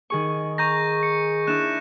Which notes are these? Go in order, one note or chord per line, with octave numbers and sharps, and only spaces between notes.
D#3 G#4 C#6
G#4 A#5 C#6 G6 A#6
C#7
D4 E4 F#6 E7